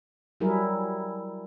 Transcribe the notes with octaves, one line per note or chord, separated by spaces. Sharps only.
F#3 G3 E4 G#4 A#4